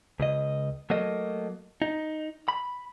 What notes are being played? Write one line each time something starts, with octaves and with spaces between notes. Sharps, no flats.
C#2 D#5
F#3 A3 A#3 D#5
D#4
B5